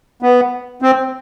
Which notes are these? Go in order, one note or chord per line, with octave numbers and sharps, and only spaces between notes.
B3
C4